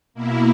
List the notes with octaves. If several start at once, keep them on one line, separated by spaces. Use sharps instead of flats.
B2 A#3 E4